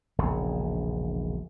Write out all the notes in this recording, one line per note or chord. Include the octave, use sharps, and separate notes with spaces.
E1 A#1 C#3